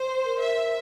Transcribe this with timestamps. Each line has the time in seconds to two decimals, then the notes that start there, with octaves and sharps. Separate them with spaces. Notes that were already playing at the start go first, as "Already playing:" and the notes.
Already playing: C5
0.25 A#4
0.41 E5